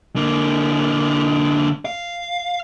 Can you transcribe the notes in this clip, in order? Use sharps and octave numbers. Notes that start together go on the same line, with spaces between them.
D3 A#3
F5